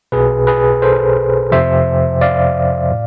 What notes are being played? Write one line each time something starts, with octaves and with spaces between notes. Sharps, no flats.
B1 B2 G#4 B4
G#4 B4
A4 C5
F2 C3 F3 C5 E5
D5 F5
A2